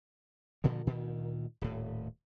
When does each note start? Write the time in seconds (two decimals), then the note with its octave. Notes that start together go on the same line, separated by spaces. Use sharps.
0.64 G2 A#2 D3 F3
0.87 D2 A#2 D#3
1.61 D#1 A2